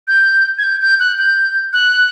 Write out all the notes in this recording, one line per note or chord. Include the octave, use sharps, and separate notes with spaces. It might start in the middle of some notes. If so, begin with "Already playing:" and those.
G6
G#6
G6
G6
F#6
G6
F#6